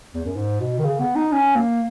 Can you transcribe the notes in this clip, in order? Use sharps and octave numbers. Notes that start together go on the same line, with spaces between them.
E2
F#2
G#2
B2
D#3
C#3
B3
D#4
C#4
A#3